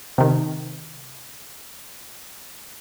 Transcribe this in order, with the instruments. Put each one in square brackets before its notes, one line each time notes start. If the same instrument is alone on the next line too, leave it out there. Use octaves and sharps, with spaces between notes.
[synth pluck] C3 D#3